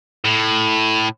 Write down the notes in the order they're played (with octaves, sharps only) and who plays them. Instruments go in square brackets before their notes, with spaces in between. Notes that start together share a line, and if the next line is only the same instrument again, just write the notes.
[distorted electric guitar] A2